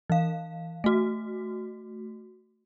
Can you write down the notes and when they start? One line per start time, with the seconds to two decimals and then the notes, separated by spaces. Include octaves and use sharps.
0.10 E3 F5
0.84 A3 F#4